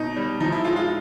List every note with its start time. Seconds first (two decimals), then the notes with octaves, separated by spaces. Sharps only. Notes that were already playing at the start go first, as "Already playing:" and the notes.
Already playing: B2 D#4
0.16 G3
0.40 F3 D#4
0.52 E4
0.64 G#3 F4
0.76 F4